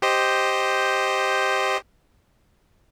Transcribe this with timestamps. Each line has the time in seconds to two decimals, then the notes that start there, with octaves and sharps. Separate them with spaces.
0.02 G4 C5 D#5